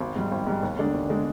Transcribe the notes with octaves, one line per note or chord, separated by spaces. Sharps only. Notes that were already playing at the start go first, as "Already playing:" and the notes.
G#1
G#2 G3
G#1
G#2 G3
D#2
D3 G#3 D4
D#2
D3 G#3 D4